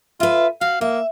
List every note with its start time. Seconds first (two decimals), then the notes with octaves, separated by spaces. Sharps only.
0.20 F4 B4 E5
0.61 F#4 F5
0.81 A#3 E5